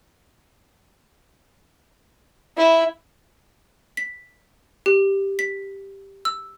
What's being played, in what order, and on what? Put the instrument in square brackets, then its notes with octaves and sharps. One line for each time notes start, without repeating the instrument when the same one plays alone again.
[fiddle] E4
[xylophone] B6
G4
B6
E6